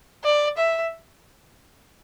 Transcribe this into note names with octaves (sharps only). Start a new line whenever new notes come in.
D5
E5